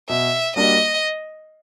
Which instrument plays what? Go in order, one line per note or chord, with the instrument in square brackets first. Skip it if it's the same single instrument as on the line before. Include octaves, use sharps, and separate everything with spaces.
[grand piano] B2 [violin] E5
[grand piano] G3 A#3 D4 F#4 [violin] D#5